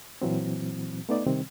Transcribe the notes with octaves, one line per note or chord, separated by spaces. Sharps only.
A#2 E3 F#3 C4
A3 B3 D#4 D5
C3 D#3 G3 C4